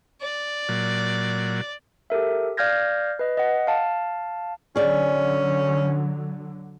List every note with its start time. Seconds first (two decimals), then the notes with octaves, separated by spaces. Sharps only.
0.22 D5
0.69 A#2 F#3
2.10 G4 A4 A#4 E5
2.57 D5 F5 F6 G6 G#6 A#6
3.19 B4 D#5
3.37 D#5 F#5
3.67 F5 A5
4.76 D3 F#3 C#4 G#4 D5